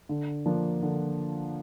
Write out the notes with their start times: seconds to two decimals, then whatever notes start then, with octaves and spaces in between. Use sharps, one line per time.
0.09 D3
0.46 F3 A#3 D4
0.83 D3